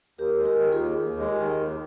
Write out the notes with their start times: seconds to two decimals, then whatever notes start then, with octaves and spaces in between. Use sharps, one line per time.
0.19 D#2 G4 A#4
0.39 G#3
0.45 G4 A#4
0.59 D#3
0.72 F4 G#4
0.80 D#2
0.99 D#2
1.19 G#3
1.26 G4 A#4
1.39 D#3
1.59 D#2